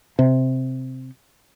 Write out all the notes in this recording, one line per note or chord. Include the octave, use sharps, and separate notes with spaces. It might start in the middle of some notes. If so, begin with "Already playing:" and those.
C3